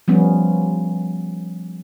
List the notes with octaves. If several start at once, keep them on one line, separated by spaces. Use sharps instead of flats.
F3 G3 B3 C#4